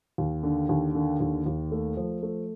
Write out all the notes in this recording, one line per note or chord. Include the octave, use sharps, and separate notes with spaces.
D#2
D3
D#2
D3
D#2
D#2
A3
F3
A3